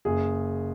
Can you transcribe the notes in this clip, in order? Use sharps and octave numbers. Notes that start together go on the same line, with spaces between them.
F#1 G#4